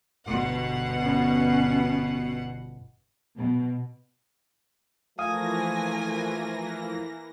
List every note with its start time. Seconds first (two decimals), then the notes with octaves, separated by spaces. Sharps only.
0.25 G1 B2 F#5
1.02 B3 C#4
3.38 B2
5.19 E3 F3 A3 A#3 F5 G#5 D#6 A#6